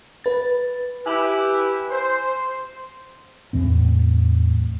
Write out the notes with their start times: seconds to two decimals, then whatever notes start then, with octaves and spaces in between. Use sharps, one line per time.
0.24 B4 A6
1.06 E4 G4 B4 G#5
1.90 C5
3.53 E2 A2 C4